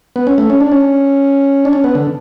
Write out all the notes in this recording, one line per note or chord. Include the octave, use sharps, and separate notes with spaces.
B3
C#4
A3
C#4
D4
C#4
D4
C#4
B3
D3